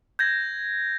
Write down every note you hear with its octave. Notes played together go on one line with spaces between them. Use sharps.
G6 G#6 A#6